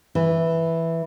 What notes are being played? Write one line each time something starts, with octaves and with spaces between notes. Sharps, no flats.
E3